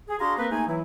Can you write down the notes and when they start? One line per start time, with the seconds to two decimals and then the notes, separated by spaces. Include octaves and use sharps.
0.08 G#4
0.20 D4 F#4 G#4 F5 A#5 C6
0.38 A#3 C4 A#4 B4
0.51 A3 A#3 D#4 G#4 G#5
0.67 E3 F#3 E4